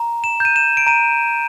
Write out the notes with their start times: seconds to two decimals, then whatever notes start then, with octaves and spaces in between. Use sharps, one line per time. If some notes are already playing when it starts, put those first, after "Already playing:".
Already playing: A#5
0.24 E7
0.40 G6 D#7
0.56 E7
0.77 D7
0.87 A#5 D#7